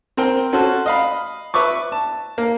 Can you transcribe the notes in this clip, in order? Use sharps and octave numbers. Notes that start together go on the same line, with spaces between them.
C4 A#4 G5
C#4 F#4 A4 C5
D#5 F5 B5
B4 E5 C#6 D6
A5
A#3